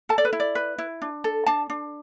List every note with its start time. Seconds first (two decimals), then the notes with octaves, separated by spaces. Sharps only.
0.09 A4 A5
0.18 D5
0.25 B4
0.33 E4
0.40 D5
0.55 B4
0.78 E4
1.02 D4
1.24 A4
1.46 D4 A5
1.70 D4